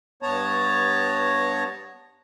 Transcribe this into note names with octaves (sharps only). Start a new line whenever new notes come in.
G2 B3 C#5 A5 A#5